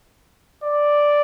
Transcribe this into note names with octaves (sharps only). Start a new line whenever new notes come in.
D5